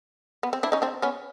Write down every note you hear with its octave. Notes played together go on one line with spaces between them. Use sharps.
B3
C4
D4 E4
C#4 D#4
C4 D4
B3 C#4